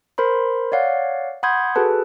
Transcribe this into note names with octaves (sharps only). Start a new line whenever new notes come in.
A#4 C5 B5 C6
C#5 D5 F5 F#5
F#5 B5 C6 D#6 G6 G#6
F#4 G#4 A4 B4 A5